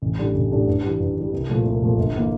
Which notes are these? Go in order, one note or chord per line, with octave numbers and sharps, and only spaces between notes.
A1
A2 G3 D4
A1
A2 G3 D4
G2
E3 G3
G2
E3 G3
C2
A#2 F3 A3
C2
A#2 F3 A3
G1
E3 A#3